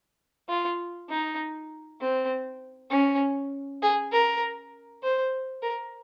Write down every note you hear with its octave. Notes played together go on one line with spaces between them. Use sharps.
F4
D#4
C4
C#4
G#4
A#4
C5
A#4